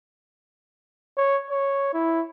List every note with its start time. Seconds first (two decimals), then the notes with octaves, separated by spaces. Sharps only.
1.17 C#5
1.50 C#5
1.93 E4